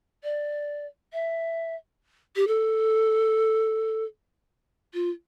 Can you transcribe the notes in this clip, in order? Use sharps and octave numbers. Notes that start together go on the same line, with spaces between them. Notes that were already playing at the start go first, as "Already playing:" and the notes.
D5
E5
G4
A4
F4